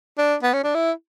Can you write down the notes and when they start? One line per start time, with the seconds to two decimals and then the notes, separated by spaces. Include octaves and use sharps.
0.18 D4
0.43 B3
0.53 C#4
0.64 D4
0.74 E4